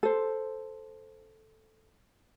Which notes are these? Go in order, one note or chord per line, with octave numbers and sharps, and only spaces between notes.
A4 C5